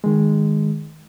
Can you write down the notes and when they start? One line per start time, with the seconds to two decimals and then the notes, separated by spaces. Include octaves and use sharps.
0.04 D#3 G#3